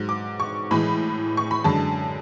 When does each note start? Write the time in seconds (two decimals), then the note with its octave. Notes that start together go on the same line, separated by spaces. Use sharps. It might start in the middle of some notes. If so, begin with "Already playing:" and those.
Already playing: G#2 F#3
0.09 D6
0.40 C#6
0.71 A2 E3 G#3 B5
1.37 C#6
1.51 B5
1.64 F#2 D3 G#3 A5